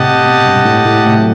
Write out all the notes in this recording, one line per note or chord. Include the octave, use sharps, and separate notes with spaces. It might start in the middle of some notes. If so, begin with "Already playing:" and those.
Already playing: A2 C3 G4 D#5 F#5 A5
B2
G2
A2
A2
A2 C3
F#3